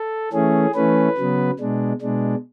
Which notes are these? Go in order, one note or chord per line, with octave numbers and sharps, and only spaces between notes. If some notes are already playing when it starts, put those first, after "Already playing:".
Already playing: A4
E3 A3 C#4 G#4
E3 A3 C#4 B4
C#3 F#3 B3
B2 G#3 D4
B2 G#3 D4